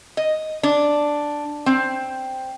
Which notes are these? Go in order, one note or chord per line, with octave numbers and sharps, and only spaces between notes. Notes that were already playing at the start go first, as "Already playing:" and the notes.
D#5
D4
C4